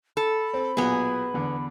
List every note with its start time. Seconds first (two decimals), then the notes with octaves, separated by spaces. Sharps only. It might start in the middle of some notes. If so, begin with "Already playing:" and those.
0.17 A4 B5
0.54 C4
0.77 B1 A#2 B3 G#4 G#5
1.34 E2 D3